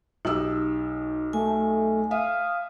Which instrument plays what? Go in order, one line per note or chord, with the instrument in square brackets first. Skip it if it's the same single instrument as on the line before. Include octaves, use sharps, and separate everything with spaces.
[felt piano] B1 G4 E6 [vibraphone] D#4
[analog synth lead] A3 [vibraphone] G#5
[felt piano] E5 [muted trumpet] F5 [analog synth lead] D#6